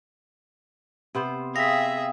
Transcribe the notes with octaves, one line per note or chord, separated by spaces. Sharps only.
C3 B3 C5
G#4 E5 F5 G5 D#6 A#6 B6